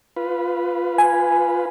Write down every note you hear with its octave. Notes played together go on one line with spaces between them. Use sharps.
F4 B4
G#5